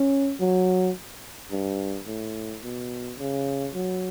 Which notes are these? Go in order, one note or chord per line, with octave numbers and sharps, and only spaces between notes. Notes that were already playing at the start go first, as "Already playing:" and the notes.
Already playing: C#4
F#3
G2
A2
B2
C#3
F#3